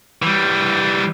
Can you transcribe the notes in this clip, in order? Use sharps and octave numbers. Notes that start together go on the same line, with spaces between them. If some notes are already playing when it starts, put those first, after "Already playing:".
E3 G3